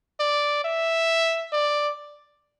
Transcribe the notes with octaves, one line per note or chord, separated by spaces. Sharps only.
D5
E5
D5